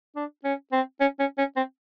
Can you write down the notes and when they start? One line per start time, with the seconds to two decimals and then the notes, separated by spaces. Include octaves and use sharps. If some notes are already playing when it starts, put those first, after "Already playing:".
0.16 D4
0.45 C#4
0.72 C4
1.01 C#4
1.19 C#4
1.38 C#4
1.56 C4